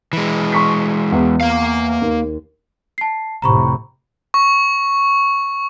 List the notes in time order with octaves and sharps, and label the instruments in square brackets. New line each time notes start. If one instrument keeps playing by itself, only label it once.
[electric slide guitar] E3 G#3
[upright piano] C6 C#6 B6
E2
[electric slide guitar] A#3 F5
[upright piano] D#2
[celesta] A5 C7
[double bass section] F1 A2 C3 [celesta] A#5 B5 C#6
[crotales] C#6